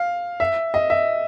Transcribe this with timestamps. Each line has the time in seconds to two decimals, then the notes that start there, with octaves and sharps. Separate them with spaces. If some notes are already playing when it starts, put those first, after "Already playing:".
Already playing: F5
0.40 E5
0.74 D#5
0.90 E5